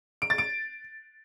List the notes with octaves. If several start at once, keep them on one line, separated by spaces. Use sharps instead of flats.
D7
A6
D7